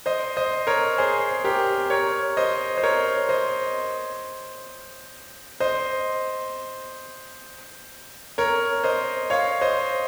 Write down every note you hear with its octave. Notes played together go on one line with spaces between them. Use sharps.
C5 D#5
C5 D#5
A#4 C#5
G#4 C5
G4 A#4
A#4 C#5
C5 D#5
C5
A#4 C#5
C5 D#5
C5 D#5
A#4 C#5
C5 D#5
C#5 F5
C5 D#5